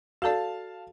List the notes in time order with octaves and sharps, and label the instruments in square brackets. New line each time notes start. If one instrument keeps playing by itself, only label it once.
[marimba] F#4 A4 D5 [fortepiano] F5 A5